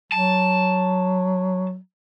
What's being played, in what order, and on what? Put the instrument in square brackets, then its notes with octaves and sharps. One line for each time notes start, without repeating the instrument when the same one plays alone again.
[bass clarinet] F#3 [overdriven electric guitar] A5